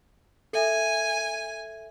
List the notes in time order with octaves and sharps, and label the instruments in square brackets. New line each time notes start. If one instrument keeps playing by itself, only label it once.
[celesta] A4 E5 [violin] G#5